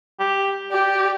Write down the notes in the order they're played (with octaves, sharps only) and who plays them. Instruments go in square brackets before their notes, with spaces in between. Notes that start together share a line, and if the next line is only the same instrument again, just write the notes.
[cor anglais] G4
[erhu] G4 [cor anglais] D5